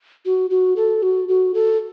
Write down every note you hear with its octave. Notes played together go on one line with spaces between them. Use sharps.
F#4
F#4
A4
F#4
F#4
A4